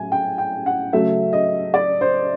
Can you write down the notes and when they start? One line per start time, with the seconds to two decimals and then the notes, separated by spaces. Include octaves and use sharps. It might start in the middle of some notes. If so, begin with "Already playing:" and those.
Already playing: A2 F#3 G#5
0.12 G5
0.38 G5
0.66 F#5
0.93 C#3 F#3 A3 E5
1.33 D#5
1.74 D5
2.01 C5